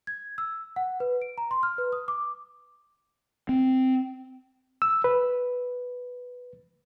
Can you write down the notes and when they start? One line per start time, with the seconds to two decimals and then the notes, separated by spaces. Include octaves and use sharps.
0.07 G#6
0.38 E6
0.76 F#5
1.00 B4
1.22 D7
1.38 A#5
1.51 C6
1.63 F6
1.78 B4
1.92 D#6
2.08 D6
3.49 C4
4.82 E6
5.04 B4